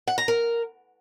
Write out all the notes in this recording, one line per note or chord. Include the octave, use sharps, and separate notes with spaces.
F#5
A#5
A#4